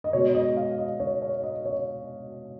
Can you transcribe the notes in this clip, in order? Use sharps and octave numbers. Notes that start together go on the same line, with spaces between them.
D#5
B2 G#3 C#5
D#5
F5
D#5
C#5
C#5
D#5
C#5